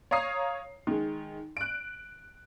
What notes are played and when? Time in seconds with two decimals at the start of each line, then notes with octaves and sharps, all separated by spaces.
0.11 C#5 F5 A#5 D#6 C7
0.87 D#3 G#3
1.57 F#6 D7